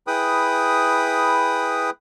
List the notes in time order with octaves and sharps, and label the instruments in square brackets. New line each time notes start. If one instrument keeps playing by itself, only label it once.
[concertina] E4 G#4 B4 G5 B5 D#6